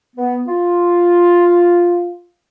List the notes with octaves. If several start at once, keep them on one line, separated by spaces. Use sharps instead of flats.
B3
F4